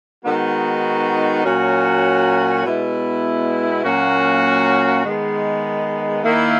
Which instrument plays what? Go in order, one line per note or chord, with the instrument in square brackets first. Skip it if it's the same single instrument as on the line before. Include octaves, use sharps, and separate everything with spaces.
[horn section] D#3 G#3 B3 D#4 F#4
A#2 F#3 C#4 F#4
B2 G#3 B3 E4
A#2 F#3 A#3 C#4 F#4
D#3 G#3 B3
D#3 A#3 E4